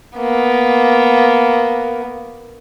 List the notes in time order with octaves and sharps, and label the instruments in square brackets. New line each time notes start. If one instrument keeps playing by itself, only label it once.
[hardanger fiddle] A#3 B3